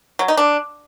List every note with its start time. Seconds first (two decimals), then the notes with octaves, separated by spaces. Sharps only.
0.19 F#3
0.28 D#4
0.37 D4